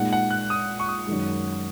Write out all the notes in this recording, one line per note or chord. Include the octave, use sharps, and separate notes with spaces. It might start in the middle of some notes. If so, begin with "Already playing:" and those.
Already playing: A#2 G#3 D#4 F#5
F#5
F#6
D#6
C#6
D#6
F#2 D#3 G#3